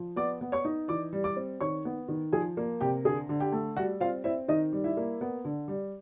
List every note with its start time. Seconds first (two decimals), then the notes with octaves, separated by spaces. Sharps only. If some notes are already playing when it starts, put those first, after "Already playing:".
Already playing: F3
0.16 B3 D5 D6
0.41 B3
0.52 C#5 C#6
0.65 D#4
0.88 E3 D5 D6
1.13 G3
1.24 D5 D6
1.37 C4
1.61 D#3 C#5 C#6
1.85 B3
2.08 D#3
2.33 F3 G#4 G#5
2.57 A#3
2.81 C3 G4 G5
3.04 D3 G#4 G#5
3.29 D3
3.40 G4 G5
3.52 A3
3.77 G3 F#4 F#5
4.00 C4 F4 F5
4.24 C4 E4 E5
4.48 D#3 D#4 D#5
4.73 G3
4.84 E4 E5
4.97 A#3
5.21 B3
5.45 D3
5.68 G3